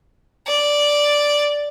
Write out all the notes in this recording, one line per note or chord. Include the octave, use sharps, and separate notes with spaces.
D5